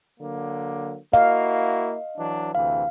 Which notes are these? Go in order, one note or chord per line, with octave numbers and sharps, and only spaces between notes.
D3 F#3 A#3
A#3 E4 F#4 D#5 F5
E3 F#3 D4
D2 C3 E3 F5